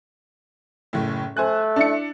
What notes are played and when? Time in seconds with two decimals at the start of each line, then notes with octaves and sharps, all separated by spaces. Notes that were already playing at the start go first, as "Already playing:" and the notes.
0.93 F#1 A2
1.37 A3 C5 G#5 F#6
1.76 D4 E4 C#7